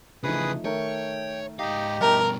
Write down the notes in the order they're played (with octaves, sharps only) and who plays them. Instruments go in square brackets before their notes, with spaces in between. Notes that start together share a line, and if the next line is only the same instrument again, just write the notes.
[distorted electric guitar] C#3 E3 [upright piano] F3 A3 D#4 [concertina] G#4 B4 D#6
[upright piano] D#3 A3 A#4 [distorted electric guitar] C#5 [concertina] G5
[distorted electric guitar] G#2 F5 [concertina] D#4 G4 D#5
[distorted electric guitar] G2 B2 [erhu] A#4 [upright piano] E5 G5 A5